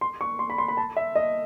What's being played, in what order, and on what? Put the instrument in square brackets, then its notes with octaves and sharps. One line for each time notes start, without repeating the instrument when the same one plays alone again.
[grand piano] C6
C#6
C6
B5
C6
B5
A5
E5
D#5